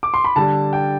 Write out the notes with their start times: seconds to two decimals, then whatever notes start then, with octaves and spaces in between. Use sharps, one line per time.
0.03 D6
0.14 C6
0.24 B5
0.36 D3 G3 D4 A5
0.73 G5